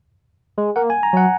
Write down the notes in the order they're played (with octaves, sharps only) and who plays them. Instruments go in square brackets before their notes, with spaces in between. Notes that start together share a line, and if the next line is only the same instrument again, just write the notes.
[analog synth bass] G#3
[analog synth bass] A#3 [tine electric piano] F#5
[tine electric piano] G#5
A#5
[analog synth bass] F#3 [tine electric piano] F#5